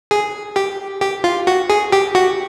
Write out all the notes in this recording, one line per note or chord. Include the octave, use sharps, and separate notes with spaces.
G#4
G4
G4
F4
F#4
G#4
G4
F#4